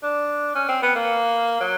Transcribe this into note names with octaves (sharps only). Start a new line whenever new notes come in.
D4
C#4
C4
B3
A#3
F#3